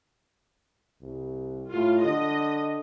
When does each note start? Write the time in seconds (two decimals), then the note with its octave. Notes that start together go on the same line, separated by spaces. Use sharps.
1.01 C2
1.73 A2 F4
2.04 D3 D#5